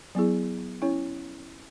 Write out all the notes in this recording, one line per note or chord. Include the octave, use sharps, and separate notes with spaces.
F#3 B3 E4 G#4
C#4 E4 C#5